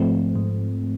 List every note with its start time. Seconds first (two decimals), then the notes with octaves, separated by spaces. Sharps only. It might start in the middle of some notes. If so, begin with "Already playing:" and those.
Already playing: G#2 F3 A3 C4
0.36 G#2